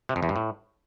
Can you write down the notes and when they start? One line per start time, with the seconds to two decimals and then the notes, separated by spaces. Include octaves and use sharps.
0.09 C3
0.16 F2
0.23 E2
0.29 G2
0.36 A2